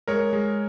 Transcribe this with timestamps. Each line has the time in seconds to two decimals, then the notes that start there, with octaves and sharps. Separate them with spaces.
0.08 G#3 A#4 C#5
0.33 G#3